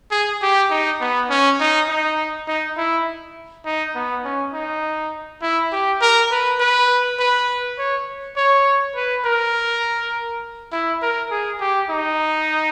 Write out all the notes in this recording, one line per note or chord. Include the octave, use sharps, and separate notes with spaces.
G#4
G4
D#4
B3
C#4
D#4
D#4
D#4
E4
D#4
B3
C#4
D#4
E4
G4
A#4
B4
B4
B4
C#5
C#5
B4
A#4
E4
A#4
G#4
G4
D#4